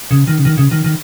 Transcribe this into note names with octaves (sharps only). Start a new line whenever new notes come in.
C#3
D#3
C#3
D#3
C#3
D#3
D#3